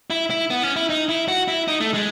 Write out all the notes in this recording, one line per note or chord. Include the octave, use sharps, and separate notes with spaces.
E4
E4
B3
C#4
E4
D#4
E4
F#4
E4
D#4
A3
G#3